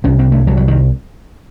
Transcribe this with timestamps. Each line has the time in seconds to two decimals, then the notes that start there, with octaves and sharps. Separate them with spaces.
0.04 C2 C3 C#4
0.19 C4
0.32 A3
0.46 C2 C3 F#3
0.57 F#3
0.68 D#3